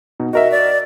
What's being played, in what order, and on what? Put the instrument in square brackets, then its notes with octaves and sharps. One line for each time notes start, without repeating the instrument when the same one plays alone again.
[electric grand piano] B2 D#4
[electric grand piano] F#4 A#4 E5 [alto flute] D#5
[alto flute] D5